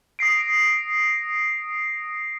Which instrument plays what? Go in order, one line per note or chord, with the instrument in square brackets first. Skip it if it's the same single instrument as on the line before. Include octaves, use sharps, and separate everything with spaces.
[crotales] D#6 A#6 C7 D7